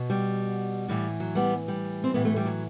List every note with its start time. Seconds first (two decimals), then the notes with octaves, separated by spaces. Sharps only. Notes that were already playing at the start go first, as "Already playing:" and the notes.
Already playing: B2
0.10 G3
0.88 A2 E3 G3
1.20 F#3
1.35 G3 B3
1.68 G3
2.04 C4
2.14 A2 E3 B3
2.25 A3
2.36 G3
2.46 F#3